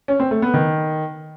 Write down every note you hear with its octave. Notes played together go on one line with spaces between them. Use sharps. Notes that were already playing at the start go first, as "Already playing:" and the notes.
C#4
C4
A3
B3
D#3